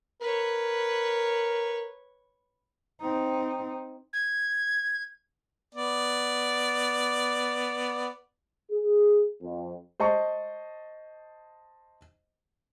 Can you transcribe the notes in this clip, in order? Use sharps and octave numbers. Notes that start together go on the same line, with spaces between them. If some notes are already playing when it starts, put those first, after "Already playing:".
A#4 B4 C#5
C4 D#4
G#6
B3 D5
G#4
F2
C5 D#5 A5 C#6